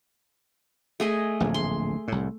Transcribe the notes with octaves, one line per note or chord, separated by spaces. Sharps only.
A3 G#4 D#5
D1 A#1
C6
C2 A2